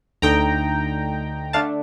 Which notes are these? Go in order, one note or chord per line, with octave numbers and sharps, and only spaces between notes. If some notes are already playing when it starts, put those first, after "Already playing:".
D2 D3 A3 D#4 G5 A#5
D3 A3 D4 F5 A5